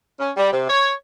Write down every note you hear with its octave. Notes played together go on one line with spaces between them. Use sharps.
C#4
G3
C3
C#5